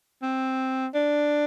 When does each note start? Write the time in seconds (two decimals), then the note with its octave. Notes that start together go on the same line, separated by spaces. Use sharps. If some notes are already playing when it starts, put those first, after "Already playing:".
0.22 C4
0.94 D4